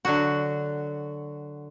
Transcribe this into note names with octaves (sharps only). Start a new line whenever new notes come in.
D3 F#3 F#4